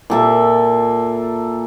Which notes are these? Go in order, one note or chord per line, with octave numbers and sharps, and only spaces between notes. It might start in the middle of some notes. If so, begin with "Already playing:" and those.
A#2 A4 E5